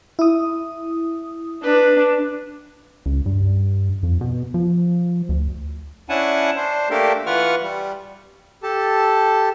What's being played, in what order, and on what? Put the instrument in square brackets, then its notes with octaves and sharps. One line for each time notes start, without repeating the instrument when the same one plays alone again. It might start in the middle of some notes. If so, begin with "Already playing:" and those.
[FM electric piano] E4 D#6
[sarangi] D4 [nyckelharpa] B4
[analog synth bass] C#2
G2
F2
B2
F3
D2
[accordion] C#4 D4 E4 F#5 G#5 A5
D4 C5
A3 A#3 D4 G4 A4 A#4
E3 F4 B4 F#5 C#6 F6
G3
[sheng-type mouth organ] G4 A4 A5